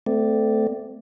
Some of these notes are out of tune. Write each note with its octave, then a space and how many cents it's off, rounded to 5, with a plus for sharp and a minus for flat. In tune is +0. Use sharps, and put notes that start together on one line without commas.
A3 +0 C4 -30 D5 +0